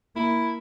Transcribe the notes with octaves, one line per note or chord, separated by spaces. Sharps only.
A#3 E4